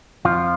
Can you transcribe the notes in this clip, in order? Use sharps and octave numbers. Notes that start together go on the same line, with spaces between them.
F2 F3 F4